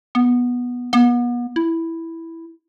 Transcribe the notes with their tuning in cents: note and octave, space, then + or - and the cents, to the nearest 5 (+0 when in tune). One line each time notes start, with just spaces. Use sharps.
B3 -10
B3 -35
E4 +0